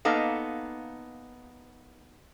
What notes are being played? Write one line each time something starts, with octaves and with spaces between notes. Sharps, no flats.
A#3 B3 D#4 A4 F5